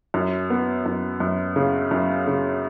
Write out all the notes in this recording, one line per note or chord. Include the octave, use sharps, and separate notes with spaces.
F#2
B3
F#2
F#2
C#3
F#2
C#3